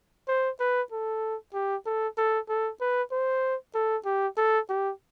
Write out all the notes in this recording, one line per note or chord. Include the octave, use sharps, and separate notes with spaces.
C5
B4
A4
G4
A4
A4
A4
B4
C5
A4
G4
A4
G4